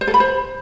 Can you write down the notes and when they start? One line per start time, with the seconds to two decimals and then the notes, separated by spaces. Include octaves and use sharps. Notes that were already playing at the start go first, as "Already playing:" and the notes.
0.01 C5
0.07 A4
0.14 B5
0.20 C5